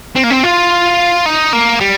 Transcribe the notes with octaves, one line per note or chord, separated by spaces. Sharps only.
C4
A#3
C4
F4
D#4
A#3
G3